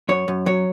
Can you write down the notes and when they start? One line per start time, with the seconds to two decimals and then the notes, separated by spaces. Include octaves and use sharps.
0.09 F#2 C#5
0.28 F#2
0.46 F#3 C#5